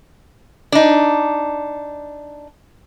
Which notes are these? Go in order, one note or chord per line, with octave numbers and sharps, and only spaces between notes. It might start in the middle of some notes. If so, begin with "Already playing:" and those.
D4 D#4